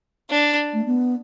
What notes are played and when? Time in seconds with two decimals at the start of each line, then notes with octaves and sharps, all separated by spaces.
0.30 D4
0.73 A3
0.86 B3